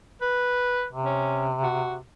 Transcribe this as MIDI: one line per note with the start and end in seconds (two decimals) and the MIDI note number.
0.21 0.85 71
0.93 2.04 48
1.05 1.46 61
1.63 1.95 66